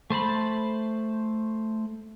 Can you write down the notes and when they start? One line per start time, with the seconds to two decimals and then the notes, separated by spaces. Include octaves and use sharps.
0.10 A3 C5 A5 B5